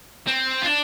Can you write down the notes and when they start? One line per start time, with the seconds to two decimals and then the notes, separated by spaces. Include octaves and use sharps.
0.27 C4
0.62 F4
0.66 D4